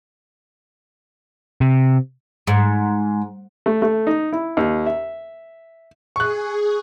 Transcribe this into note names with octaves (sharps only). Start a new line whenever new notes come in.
C3
G#2
A3
A3
D#4
E4
D#2
E5
G#4 C#6 F#6